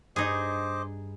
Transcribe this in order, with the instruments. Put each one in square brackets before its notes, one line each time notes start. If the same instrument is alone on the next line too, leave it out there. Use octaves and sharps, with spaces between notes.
[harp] G2 [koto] D#4 G#4 [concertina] C5 D#5 D6